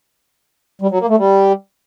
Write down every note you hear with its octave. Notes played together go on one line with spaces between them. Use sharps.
G3
F#3
A#3
A3
G3